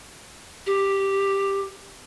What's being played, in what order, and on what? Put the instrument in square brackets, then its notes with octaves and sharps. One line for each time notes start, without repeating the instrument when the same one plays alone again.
[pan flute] G4